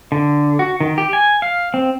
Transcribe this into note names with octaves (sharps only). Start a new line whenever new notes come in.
D3
F#4
D#3
G4
G#5
F5
C4